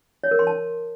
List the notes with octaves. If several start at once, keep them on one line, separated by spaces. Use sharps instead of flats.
C#5
A#4
C6
A5